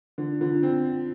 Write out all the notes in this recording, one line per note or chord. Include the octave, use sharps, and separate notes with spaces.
D3 F4
D3 F4
C4 F4
F4